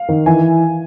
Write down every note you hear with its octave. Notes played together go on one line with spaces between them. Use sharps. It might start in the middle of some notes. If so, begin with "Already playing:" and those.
Already playing: F5
D#3
E3 G#5